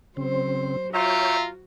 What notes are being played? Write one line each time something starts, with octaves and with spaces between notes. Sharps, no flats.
C#3 F#3 C4 C5
F4 F#4 C#5 E5 G5 A#5